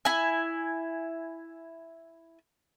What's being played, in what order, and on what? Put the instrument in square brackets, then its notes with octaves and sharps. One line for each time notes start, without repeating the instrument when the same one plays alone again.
[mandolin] E4 G#5